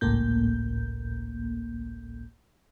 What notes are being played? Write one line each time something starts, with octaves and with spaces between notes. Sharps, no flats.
G#1 C#2 A2 A#3 G6